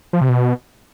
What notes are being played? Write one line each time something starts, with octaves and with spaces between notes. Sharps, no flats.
F3
C3
B2